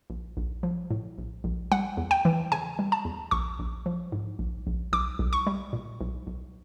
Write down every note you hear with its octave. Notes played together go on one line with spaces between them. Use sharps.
A#1
A#1
F3
A2
A#1
A#1
G3 F#5
E2
G5
E3
C#3 G#5
G3
A5
E2
A#1 C#6
A#1
F3
G#2
A#1
A#1
B1 D6
B1
C#6
G3
A#2
B1
B1